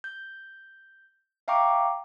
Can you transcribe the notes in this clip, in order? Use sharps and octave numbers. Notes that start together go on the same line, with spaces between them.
G6
E5 F5 G5 A#5 C#6 D6